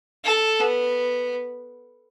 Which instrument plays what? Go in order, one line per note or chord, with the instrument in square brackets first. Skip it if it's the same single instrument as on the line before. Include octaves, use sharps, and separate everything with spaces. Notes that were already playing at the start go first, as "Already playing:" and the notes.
[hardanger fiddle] A4
B3